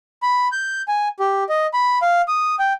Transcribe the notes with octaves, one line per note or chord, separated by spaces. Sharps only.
B5
G6
G#5
G4
D#5
B5
F5
D#6
G5